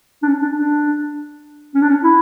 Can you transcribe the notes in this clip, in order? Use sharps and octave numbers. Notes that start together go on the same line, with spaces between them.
D4
C#4
D4
D4
C#4
D4
C#4
E4